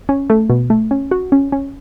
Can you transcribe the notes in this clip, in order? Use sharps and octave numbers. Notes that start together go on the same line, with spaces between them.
C#4
A3
B2
A3
C#4
F#4
C#4
C#4